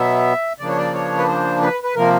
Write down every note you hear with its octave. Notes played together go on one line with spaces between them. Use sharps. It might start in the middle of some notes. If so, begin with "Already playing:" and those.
Already playing: B2 F#3 B3 E5
C#3 F3 A#3 D4 D5
C#5
D5
C#5
B4
C5
B4
B4
C3 F3 A#3 A#4